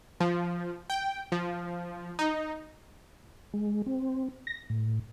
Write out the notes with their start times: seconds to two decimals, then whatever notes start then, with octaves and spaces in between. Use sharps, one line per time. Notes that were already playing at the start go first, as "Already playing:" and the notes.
0.20 F3
0.90 G5
1.32 F3
2.19 D#4
3.54 G#3
3.86 C4
4.47 A#6
4.70 A2